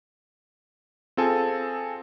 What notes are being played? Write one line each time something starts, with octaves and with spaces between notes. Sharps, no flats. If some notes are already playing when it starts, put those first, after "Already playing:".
C4 F4 G#4 A4 G#5